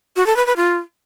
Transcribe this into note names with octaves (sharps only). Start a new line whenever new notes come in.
F#4
A4
B4
B4
F4